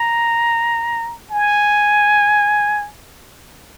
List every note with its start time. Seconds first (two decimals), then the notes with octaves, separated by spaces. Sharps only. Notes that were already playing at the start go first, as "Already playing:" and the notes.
Already playing: A#5
1.31 G#5